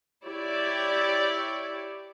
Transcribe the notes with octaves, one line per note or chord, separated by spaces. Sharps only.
E4 G4 C#5 D5